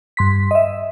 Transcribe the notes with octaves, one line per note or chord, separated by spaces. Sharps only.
G2 C6 B6
D#5 E5